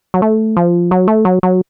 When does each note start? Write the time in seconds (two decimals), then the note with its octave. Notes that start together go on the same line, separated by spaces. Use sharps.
0.14 F#3
0.22 A3
0.57 F3
0.91 F#3
1.08 A3
1.25 F#3
1.43 F#3